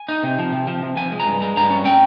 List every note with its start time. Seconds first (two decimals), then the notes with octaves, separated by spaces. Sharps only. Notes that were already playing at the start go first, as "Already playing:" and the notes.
Already playing: G#5
0.08 D#4
0.23 C3
0.39 F3
0.53 C3
0.67 F3
0.82 C3
0.96 F3 G#5
1.12 G#3
1.20 A#5
1.26 G2
1.41 G#3 A#5
1.56 G2 A#5
1.70 C#4
1.85 C#4 G5